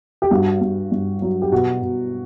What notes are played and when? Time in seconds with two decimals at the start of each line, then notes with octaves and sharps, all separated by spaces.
0.22 G4
0.31 G2 F#4
0.61 G2
0.92 G2
1.22 F#3
1.42 G4
1.52 B2 F#4
1.82 B2